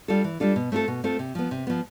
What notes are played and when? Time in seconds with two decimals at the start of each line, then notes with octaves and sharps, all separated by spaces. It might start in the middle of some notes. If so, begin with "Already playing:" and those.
0.08 G3 D4 F4 A4
0.24 E3
0.40 G3 D4 F4 A4
0.56 B2
0.72 A3 C4 F4 A4
0.88 B2
1.04 A3 C4 F4 A4
1.19 C3
1.35 F3 B3
1.51 C3
1.67 F3 B3